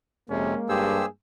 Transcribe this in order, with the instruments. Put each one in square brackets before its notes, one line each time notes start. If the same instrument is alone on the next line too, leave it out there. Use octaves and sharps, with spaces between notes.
[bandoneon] F2 C3 [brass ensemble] G#3 A#3 [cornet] C#4
[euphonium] G2 [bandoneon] G4 C5 E6 [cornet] G#4